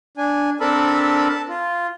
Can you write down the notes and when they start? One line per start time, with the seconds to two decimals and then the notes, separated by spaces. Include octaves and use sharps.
0.17 D4 G#5
0.60 C4 D4 A4 A#4 A5 B5
1.29 A5
1.49 F4